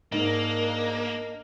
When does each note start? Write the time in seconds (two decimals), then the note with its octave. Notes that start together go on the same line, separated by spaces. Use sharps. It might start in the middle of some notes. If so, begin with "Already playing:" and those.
0.12 G#2 A#3 D4 A#4 D#5